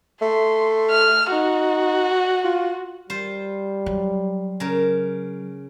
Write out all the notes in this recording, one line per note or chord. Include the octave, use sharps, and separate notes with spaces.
A3 C6
F6
D#4 F#4
F4
G3 F4 C5
F#3
C#3 A#4